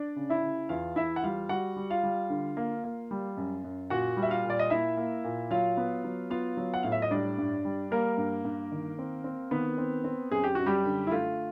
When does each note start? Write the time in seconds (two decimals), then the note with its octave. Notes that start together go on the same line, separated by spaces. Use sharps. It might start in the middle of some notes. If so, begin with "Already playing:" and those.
Already playing: D4 D5
0.16 C#3
0.30 E4 E5
0.43 C#3
0.69 E2 F4 F5
0.96 E2 E4 E5
1.16 F#5
1.23 G3 F4 F5
1.49 G3 F#4 F#5
1.76 G3
1.90 F4 F5
2.03 G3
2.30 D3
2.57 A#3
2.84 A#3
3.11 G3
3.37 F#2
3.64 F#2
3.90 A#2 F#4 F#5
4.17 G3
4.23 E5
4.30 F4 F5
4.44 A#2
4.50 D5
4.59 D#5
4.70 A#3 E4 E5
4.97 A#3
5.24 A#2
5.51 F#3 F4 F5
5.77 B3
6.04 F#3
6.30 B3 F4 F5
6.57 F#3
6.74 F#5
6.83 A2 F5
6.92 E5
7.02 D#5
7.11 G3 D4 D5
7.38 G2
7.65 G3
7.91 G3 A#3 A#4
8.18 G2
8.45 G2
8.72 D#3
8.99 C4
9.24 C4
9.51 D#3 B3 B4
9.78 C4
10.04 C4
10.31 F#2 G#4
10.44 G4
10.55 F#2 F#4
10.66 G3 G4
10.85 D3
11.07 E4
11.11 A3 F4